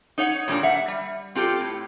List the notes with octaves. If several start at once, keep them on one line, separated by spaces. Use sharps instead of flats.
D#4 C#5 F#5
A#2 G3 A#3 D4
E5 F#5
G3
C4 F4 G4 A4
A2